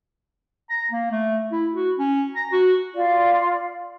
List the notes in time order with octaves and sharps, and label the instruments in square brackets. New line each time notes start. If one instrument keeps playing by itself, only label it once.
[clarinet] A#5
A#3
A3
E4
F#4
C#4
A#5
F#4
[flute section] F4 D5